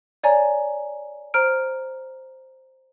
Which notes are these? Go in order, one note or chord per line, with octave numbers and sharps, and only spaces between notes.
C#5 D5 G#5 A#5
C5 A#5 F6 D7